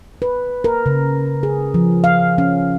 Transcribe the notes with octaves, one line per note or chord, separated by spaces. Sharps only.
B4
A#4
C#3
G#4
F3
F5
C#4